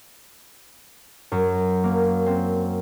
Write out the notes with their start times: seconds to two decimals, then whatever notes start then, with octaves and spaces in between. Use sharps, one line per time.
1.32 F#2
1.84 A#3
2.26 C4